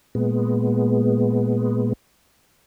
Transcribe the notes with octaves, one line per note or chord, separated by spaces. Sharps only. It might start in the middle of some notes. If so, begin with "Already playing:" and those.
A#2 G#3 B3